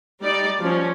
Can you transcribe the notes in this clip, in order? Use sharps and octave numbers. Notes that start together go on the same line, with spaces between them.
G3 D#4 D5
F3 C#4